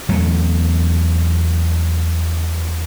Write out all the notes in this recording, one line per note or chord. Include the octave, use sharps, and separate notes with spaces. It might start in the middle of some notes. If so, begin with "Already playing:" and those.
E2 F#3 A3